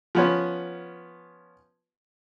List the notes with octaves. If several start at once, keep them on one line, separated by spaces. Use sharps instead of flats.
F3 B3 C#4